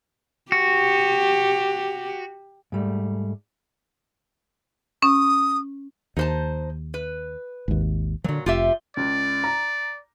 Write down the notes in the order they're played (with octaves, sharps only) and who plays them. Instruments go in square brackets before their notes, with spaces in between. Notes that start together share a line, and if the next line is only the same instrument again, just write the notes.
[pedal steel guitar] F#4 [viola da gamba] G4
[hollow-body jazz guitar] G#2 G3 A3
[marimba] C#4 [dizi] D#6
[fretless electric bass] D#2 [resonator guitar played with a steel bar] D#4 C5 A5
[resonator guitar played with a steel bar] B4
[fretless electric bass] G#1 D#2
[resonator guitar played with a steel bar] A#2 F#3 [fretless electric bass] D3 F3
[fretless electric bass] F1 [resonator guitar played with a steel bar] F4 G4 E5
[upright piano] C#2 [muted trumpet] D5
[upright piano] A#5